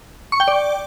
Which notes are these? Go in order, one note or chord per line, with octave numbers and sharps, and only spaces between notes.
C#6
G5
D5